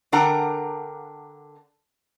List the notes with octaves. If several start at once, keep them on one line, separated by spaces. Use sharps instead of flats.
D3 D4 A#4 F#5 G5 A#5